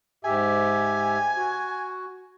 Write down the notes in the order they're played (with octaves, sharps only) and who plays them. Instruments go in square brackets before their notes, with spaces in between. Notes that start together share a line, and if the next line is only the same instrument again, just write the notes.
[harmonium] G#2 G4 E5 [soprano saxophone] G#5
[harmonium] F#4